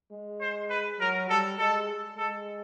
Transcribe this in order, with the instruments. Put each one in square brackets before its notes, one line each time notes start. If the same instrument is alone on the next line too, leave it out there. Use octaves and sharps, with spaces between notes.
[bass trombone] G#3
[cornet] C5
B4
[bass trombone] F#3 [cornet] A#4
[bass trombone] G3 [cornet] A4
[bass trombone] G#3 [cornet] A4
[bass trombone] G#3 [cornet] A4